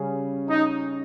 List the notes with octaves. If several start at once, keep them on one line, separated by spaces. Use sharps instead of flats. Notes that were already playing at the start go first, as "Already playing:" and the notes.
Already playing: C#3 G3 C#4 G#4
D#4